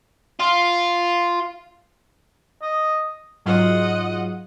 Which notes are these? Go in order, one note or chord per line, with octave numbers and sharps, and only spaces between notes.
F4
D#5
G#2 F#3 F4 D#5 F#5